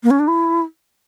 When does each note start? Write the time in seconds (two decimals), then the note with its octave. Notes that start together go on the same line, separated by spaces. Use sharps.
0.03 A#3
0.11 C#4
0.19 D4
0.28 E4